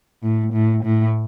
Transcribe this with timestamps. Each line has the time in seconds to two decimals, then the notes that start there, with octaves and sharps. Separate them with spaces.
0.23 A2
0.53 A2
0.84 A2